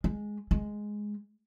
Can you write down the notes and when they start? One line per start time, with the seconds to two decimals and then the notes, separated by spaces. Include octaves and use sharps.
0.04 G#3
0.51 G#3